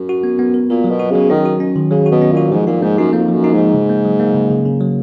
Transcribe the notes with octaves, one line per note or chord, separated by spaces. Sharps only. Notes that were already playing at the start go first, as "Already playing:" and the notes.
Already playing: F#2
F#4
B3
B3
A#4
A#2 A#4
F#3
B2
F#4
C#3 F#3
D#3 C#4
F#4
C#4
D#3
C#3 F#3
F#4
B2
C#4
A#2
F#4
G#2 F3
A#2 D#4
G#2 A#3
F#2 D#4
F2 A#3
F3
F#2
D#4
G#2 F3
C#3
A#3
F#3
A#3
C#3
C#3
C#3
F#3